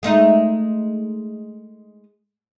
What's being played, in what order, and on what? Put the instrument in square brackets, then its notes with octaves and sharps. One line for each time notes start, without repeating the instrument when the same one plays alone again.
[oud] G#3 A3 D#4